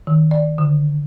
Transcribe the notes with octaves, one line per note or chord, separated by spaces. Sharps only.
D#3
D5
D3